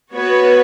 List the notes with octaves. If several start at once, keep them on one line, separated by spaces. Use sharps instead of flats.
B3 F#4 B4 C#5